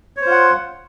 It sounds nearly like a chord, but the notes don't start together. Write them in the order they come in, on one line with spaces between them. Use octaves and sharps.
C#5 C5 F4 F#5